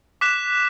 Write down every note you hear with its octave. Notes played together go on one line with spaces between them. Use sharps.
D6 F#6 B6 E7